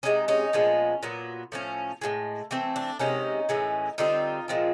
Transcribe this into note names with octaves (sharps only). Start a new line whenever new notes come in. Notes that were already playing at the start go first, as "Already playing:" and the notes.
C3 F3 G#3 C#4 D#4
C#4 D#4
A#2 F3 G#3 B3 C#4
A#2 F#3 B3
A2 F3 A3 C#4
A2 F3 G#3
E3 A3 C4
D4
C3 D#3 G#3 C#4 D#4
A2 E3 G#3 C#4
D3 G3 C4 D#4 F4
A#2 F3 G#3 C4